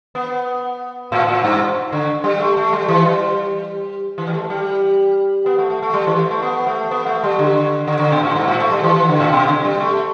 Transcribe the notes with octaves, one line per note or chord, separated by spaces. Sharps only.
B3
A2
A2
G2
D3
G3
A3
A3
G3
E3
G3
E3
G3
A3
G3
B3
A3
A3
A3
G3
E3
A3
A3
B3
A3
B3
A3
G3
D3
D3
D3
B2
A2
G2
A2
A3
G3
E3
E3
D3
A2
B2
D3
G3
A3